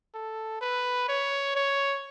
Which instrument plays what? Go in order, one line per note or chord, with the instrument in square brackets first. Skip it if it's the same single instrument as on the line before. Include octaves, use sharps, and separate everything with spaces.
[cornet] A4
B4
C#5
C#5